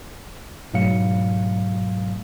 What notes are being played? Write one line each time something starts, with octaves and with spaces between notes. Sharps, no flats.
G#2 B2 F#3 A3 F5 C#7